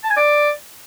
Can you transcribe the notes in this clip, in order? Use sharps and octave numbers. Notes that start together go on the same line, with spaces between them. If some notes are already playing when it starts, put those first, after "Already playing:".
A5
G#5
D5